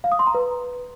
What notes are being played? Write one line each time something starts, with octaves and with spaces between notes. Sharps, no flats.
F5
D#6
C6
A#5
B4